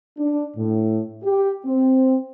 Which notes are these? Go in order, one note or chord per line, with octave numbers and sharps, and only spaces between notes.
D4
A2
G4
C4